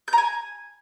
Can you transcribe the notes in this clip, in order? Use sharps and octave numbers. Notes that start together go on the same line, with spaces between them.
G6
A#5
G#5